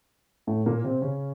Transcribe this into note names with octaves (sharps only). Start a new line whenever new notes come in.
A2 A3
A#2 A#3
C3 C4
C#3 C#4